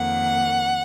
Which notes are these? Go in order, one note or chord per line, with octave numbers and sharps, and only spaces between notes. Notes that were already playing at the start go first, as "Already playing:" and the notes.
Already playing: F2 D#3 A#3 F#5